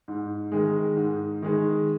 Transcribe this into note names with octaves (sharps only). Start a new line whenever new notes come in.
G#2
D#3 G#3
G#2
D#3 G#3